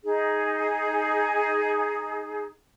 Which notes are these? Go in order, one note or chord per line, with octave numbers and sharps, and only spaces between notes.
D#4 G#4